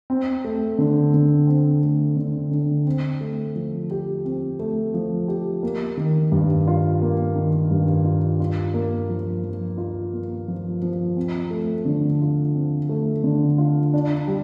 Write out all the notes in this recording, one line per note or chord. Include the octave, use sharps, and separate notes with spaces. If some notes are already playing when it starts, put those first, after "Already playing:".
C4
A3
D3
D3
C4
A3
D3
D3
C4
A3
F3
G4
C4
A3
F3
G4
A#3
D#3
G2
F4
A#3
D#3
G2
F4
F4
A#3
F3
F3
F4
A#3
F3
F3
C4
A3
D3
F4
C4
A3
D3
F4
D4
G3